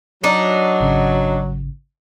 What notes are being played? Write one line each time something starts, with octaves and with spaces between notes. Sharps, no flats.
F#3 D4 D#4
G#1 C#3